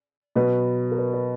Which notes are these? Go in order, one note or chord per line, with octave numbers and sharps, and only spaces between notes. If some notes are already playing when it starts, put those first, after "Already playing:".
B2 F#3 B4
A#4
B4
B4